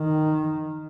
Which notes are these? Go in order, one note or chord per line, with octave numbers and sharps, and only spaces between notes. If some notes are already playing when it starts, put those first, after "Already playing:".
Already playing: D#3